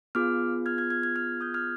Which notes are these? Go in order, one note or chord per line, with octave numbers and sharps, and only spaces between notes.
B3 F4 G#4 D6 F6
F6 G#6
F6 G#6
F6 G#6
F6 G#6
F6 G#6
D#6 G6
F6 G#6